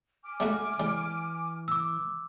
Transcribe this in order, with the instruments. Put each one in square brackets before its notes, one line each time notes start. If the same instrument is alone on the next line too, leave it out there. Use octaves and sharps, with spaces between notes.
[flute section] G#5 D6 F6
[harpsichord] G3 A3 F#4
[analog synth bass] E3 [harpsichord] G3
[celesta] D6 E6